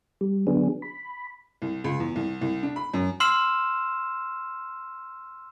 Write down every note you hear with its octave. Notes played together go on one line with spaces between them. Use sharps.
G3
D3 F#3 B3 D4 G#4
B5
C2
C#2
E2
C2
C2
D4
B5
F#2
C6 E6 F6 C7 E7